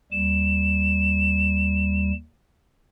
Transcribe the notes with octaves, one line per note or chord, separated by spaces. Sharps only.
D#2 G3 E7